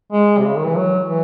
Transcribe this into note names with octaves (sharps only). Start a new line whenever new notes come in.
G#3
C3
C#3
D#3
E3
F#3
E3